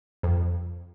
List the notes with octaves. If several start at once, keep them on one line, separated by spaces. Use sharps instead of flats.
F2